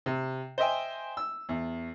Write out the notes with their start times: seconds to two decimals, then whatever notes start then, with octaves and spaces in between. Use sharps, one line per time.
0.06 C3
0.58 C5 D#5 E5 G5 G#5
1.17 E6
1.49 E2